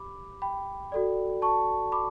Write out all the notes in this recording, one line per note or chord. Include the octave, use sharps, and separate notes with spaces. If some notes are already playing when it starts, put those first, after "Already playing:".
Already playing: G4 B5 D6
G5 B5
F#4 A4 D5
A5 C#6
B5 D6